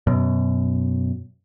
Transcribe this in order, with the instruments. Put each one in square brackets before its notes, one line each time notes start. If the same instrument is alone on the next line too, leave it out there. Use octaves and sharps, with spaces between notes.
[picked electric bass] F#2 B2